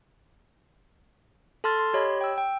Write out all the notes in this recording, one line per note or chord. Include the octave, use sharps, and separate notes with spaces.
A4 A5 C6 F6 A6
C6
G4 C#5 D#5 B5
G5 E6
G5